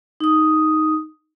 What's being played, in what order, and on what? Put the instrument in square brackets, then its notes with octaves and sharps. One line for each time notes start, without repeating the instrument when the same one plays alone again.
[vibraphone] D#4 D#6